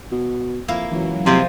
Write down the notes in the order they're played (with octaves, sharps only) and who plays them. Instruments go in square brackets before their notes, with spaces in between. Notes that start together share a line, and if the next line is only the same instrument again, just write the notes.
[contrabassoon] B2
[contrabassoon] F2 [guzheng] A#3 E4 F5
[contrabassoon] C#2 [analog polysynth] E3 F#3
[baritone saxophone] C3 [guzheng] F3 G#3 F4